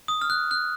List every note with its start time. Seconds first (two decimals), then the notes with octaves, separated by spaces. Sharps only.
0.08 D#6
0.21 F6
0.30 F#6
0.51 F#6